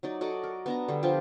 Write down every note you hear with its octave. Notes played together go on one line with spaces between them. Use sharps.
F#3 D#4 D5
F#4 A4 D5 D#5
A#4
B3 D4 A#5
D3 G3
F3 D4 F4 G4